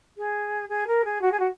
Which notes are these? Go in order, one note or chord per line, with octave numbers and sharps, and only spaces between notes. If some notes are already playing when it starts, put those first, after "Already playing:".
G#4
G#4
A#4
G#4
F#4
G#4
F#4